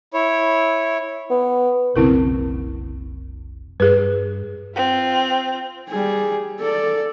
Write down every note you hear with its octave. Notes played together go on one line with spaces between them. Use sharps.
E4 C#5
B3
F1 B1 C#3 C4 E4 A#4
G2 G#4 B4
C4 F4
G3 G#4
A4 D5